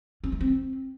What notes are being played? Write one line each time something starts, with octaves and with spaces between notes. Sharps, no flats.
C#4
A3
C4